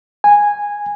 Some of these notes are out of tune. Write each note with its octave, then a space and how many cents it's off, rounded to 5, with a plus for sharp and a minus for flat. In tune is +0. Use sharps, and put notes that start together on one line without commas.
G#5 -10